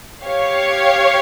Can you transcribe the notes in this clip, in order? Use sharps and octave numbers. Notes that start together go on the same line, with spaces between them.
G4 C#5 F5